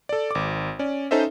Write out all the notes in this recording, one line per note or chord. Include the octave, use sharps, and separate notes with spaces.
A4 D5
G#1 D6
C#4 D5
C#4 D#4 A4 C5 D#5 E5